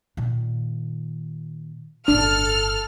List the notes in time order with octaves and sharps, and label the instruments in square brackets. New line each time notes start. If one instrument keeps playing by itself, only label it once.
[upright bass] A#2 D#3
[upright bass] G1 A2 [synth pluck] D4 [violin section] A4 F6